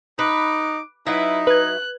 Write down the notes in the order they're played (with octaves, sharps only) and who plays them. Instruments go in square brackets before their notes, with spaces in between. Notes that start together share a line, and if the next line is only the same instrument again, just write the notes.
[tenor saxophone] D#4 [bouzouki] B4 [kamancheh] D6
[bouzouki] F#3 E5 [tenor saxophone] D#4 [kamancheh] E4 B4
[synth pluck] B4 G#6 [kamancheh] F#6